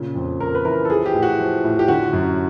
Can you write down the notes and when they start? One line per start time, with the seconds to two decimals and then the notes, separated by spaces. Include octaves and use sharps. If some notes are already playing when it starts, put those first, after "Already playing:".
Already playing: A#2 C#3
0.15 F2
0.40 F2 A#4
0.55 B4
0.65 E3 A#4
0.85 A4
0.90 F3 G#4
1.06 G4
1.14 A2
1.22 F#4
1.39 F3
1.64 A2
1.79 G4
1.88 D3 F#4
2.13 F#2